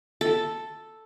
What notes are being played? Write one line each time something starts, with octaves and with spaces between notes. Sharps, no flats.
A4